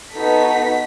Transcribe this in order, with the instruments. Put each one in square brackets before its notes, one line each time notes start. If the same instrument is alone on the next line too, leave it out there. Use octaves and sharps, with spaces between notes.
[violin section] B3 D#4 F#4 A4 B6